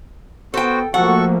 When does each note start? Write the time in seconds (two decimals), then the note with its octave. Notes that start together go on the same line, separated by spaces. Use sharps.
0.54 B3 F#4 A4 C5 G5
0.94 F3 A3 A#3 F#4 A4 F#5 C#6